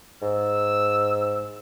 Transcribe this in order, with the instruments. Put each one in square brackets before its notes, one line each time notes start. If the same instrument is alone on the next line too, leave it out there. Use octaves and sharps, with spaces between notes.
[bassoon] G#2 [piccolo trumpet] E6